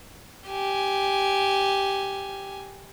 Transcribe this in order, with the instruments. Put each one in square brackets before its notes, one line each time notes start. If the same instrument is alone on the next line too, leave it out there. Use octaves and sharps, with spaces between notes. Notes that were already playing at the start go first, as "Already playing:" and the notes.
[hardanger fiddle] G4 G#5